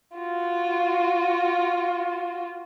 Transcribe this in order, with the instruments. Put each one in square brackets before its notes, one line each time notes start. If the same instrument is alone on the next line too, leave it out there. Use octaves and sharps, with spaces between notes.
[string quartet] F4 F#4